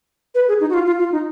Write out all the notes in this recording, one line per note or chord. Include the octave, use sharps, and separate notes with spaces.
B4
G#4
D#4
F#4
F4
F4
F4
D#4